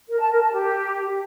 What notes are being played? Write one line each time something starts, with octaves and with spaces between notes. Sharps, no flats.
A#4
A5
A#4
A5
G4